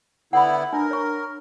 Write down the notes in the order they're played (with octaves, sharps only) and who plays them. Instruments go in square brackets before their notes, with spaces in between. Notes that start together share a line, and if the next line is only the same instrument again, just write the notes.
[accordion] D3 B3 E4 [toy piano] F#5 B5
[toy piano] D4 [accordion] A#4
[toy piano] C#5 C#6